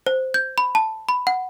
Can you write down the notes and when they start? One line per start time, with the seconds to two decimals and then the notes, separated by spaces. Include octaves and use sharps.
0.06 C5
0.34 G6
0.58 B5
0.75 A5
1.09 B5
1.27 F#5